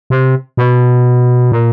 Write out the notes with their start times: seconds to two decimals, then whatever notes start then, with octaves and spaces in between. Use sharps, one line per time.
0.10 C3
0.57 B2
1.52 A#2